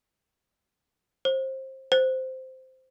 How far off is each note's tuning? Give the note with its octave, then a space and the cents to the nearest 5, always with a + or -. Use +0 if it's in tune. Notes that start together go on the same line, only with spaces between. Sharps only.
C5 +25
C5 -10